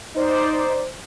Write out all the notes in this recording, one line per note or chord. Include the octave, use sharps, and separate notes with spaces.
D#4 C5 D5